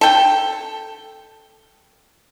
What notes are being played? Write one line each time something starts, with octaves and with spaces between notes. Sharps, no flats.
A4 G5